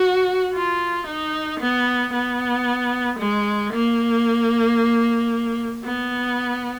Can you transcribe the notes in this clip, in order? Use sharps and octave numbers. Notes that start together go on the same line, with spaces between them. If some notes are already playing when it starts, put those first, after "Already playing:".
Already playing: F#4
F4
D#4
B3
B3
G#3
A#3
B3